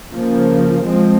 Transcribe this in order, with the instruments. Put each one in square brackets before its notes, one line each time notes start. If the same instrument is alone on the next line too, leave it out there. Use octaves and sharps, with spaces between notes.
[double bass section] C#3 F3 A#3
F3 G#3 C4